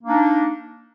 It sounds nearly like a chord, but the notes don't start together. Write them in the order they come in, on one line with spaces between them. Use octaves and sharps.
A#3 D4 D#4